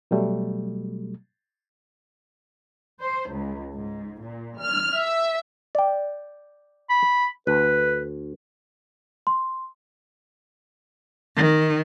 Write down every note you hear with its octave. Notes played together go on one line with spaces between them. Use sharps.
B2 F#3 G3 A3
C5
C#2
G#2
A#2
F6
E5
D5 G5
B5
D2 B4
C6
D#3